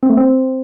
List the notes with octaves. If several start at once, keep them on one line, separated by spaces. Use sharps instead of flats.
C4
A3
C4